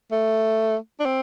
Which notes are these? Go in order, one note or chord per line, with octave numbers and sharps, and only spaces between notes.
A3
D4
C4